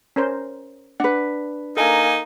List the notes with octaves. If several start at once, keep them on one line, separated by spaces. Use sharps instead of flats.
C#4 A#4 C5
D4 B4 F#5
A#3 D#4 A4 G#5